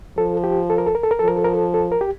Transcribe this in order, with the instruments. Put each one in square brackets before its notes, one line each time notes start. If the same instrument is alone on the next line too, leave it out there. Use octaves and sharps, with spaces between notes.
[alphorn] F3 [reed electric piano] A4
[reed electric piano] G4
A4
A#4
A4
A#4
A4
A#4
[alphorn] F3 [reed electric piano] A4
[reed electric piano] A#4
A4
A#4
A4
A4
A#4
G4